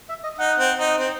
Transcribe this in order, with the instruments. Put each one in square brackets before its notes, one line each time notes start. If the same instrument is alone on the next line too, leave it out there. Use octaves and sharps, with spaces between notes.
[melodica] E5
D#5
[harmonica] D#4 [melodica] F#5
[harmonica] C4
D#4
C4